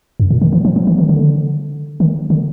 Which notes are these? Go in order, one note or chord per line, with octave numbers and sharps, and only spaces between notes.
F#2
A#2
D#3
E3
F3
F3
E3
D#3
D3
D#3
D3